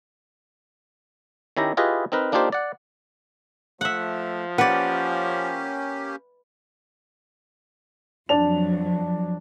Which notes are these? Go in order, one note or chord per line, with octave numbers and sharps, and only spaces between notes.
D#3 C#4 E4 G4 A#5
E4 F4 G4 G#4 B4 D#5
C4 D#4 A#4 B4
A#3 D4 D#4 F4 G4 C5
D5 F#5
F3 A3 E5 F#5
A#3 C#4 G4 B4 D5 F#5
F2 F3 F#3 D4 A5 F7